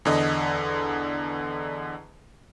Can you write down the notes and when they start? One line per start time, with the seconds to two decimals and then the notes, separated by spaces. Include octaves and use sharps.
0.05 E2 D3 D#5